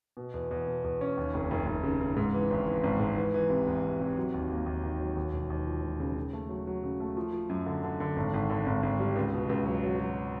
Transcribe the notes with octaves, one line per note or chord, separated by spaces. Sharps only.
B2
E2
E2
B2
E2
C#4
D#2
F1
F1
F1
C#3
C#3
G#2
E3
G#1
E3
G#1
G#2
E3
E3
C3
E2
C3
C3
F#3
D#2
A#3
D#2
D#3
F#3
D#2
E1
D#2
F3
E1
C#3
C#3
A3
F#3
F#3
C#3
A3
F3
F3
F#2
D3
D3
D3
G#1
G#1
D3
G#1
G#1
G3
C#2
B2
C#2
F#3
F#3
F#3